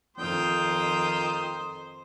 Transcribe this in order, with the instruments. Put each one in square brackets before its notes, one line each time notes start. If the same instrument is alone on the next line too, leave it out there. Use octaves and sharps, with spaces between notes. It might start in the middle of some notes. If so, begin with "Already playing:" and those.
[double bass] F2 D#3 [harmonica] F4 G5 D#6 [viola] C5